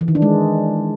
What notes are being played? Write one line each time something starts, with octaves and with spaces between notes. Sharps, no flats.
E3
D#3
D4
G#3